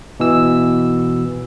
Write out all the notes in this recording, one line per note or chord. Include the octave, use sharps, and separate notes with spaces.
B2 E3 E6